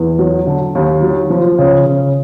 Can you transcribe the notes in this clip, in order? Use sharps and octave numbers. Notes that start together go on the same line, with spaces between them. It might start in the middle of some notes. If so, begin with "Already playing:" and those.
Already playing: E2
F#3
D3
D#2
F#3
F3
C#3
C#3